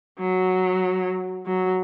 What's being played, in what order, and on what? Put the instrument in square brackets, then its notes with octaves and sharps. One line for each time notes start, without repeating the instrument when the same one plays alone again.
[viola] F#3
F#3